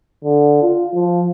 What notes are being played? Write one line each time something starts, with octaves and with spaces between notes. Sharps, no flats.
D3
F4
F3